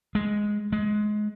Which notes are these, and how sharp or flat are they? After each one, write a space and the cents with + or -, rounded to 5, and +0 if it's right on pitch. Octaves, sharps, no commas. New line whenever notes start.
G#3 +0
G#3 +20